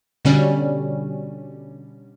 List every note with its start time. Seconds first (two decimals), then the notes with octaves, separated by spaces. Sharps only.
0.25 B2 D3 G3 C#4